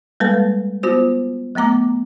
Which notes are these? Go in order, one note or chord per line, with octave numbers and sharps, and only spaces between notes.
G3 G#3 A#3 A4 B4 A5
B3 F4 F#4 C5
F#3 A3 B3 A#5 D6